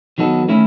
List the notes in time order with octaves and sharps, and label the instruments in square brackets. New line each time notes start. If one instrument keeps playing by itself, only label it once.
[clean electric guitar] D#3 F#3 B3 D#4 A4
D#3 A3 C#4 E4